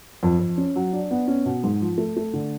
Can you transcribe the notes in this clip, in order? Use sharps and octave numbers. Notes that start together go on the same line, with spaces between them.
F2
F2
C#4
F#3
D4
B3
C#4
B2
G#2
F3
A3
A3
D3